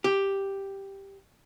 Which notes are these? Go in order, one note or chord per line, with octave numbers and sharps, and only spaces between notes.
G4